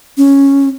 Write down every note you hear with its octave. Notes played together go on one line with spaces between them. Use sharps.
C#4